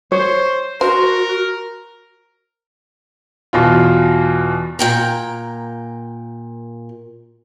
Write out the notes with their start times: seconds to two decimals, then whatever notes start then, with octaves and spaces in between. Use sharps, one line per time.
0.12 C5 C#5
0.81 F#4 A#4 C5
3.53 E2 B2 F4
4.79 A#2 G5 A#5